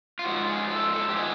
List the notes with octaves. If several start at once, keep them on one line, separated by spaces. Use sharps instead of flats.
F4
G#2 F3 F#4
G#4
A4
A4
G4
D#3 G#3 B3 G#4